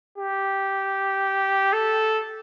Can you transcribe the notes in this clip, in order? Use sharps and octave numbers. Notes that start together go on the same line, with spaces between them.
G4
A4